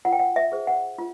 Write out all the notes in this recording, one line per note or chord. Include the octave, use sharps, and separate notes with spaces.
F4 F#5
G5
F#5
E5
G#4 C5
F#5
F4